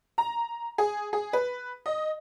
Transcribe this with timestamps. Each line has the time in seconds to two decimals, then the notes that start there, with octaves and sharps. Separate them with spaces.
0.18 A#5
0.78 G#4
1.13 G#4
1.33 B4
1.86 D#5